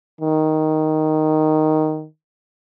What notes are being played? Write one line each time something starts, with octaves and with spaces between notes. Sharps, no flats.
D#3